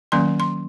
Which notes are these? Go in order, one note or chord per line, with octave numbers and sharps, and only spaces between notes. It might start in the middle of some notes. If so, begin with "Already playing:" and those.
D#3 F#3 A#3 C#4 C6
C6